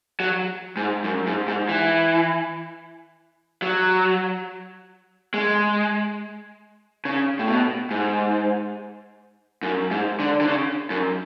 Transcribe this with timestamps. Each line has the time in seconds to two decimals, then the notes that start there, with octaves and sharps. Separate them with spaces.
0.20 F#3
0.77 G#2
1.04 F#2
1.27 G#2
1.48 G#2
1.69 E3
3.62 F#3
5.34 G#3
7.05 C#3
7.39 A2
7.48 B2
7.91 G#2
9.63 F#2
9.91 G#2
10.20 D3
10.41 D3
10.47 C#3
10.90 F#2